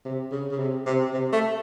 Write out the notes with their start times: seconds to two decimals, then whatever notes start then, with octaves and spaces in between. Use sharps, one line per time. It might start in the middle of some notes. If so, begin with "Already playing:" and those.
0.05 C3
0.31 C#3
0.51 C#3
0.59 C3
0.86 C3
1.13 C3
1.33 A3